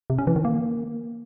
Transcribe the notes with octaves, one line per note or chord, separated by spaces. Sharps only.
C3
C#4
E3
D#3
A#3